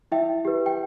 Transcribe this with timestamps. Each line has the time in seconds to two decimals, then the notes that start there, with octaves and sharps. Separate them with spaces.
0.12 E4 E5 G5
0.45 G4 B4
0.66 G5